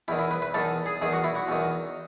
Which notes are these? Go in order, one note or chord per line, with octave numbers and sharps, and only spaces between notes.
E2 D#3 E4
E4
B4
B4
E2 D#3 A4
G#4
E2 D#3 G#4
F#4
E4
F#4
E2 D#3